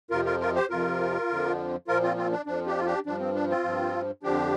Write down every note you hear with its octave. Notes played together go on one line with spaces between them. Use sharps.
F2 C3 F3 F4 A#4
F4 A#4
F4 A#4
G4 C5
F2 C3 F3 F4 A#4
F2 D3 F3
A#2 F3 F4 A#4
C4 F4
C4 F4
D4
F2 F3 D4
D4 G4
F4
D4 G4
G2 F3 D4
C4
D4
C4 F4
G2 F3
F2 D3 F3 D4 G4